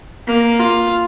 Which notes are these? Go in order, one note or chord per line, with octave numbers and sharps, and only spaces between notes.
A#3
F4